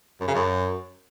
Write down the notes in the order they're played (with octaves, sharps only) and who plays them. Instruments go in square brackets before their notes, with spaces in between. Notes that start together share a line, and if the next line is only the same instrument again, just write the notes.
[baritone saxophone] F#2
C#3
F#2